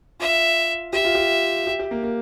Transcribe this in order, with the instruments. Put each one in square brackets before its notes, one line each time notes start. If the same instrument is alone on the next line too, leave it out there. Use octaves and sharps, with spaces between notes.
[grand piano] F4 [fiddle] E5
[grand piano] G4 [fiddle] E5
[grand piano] F4
G4
G4
G4
A#3
A#3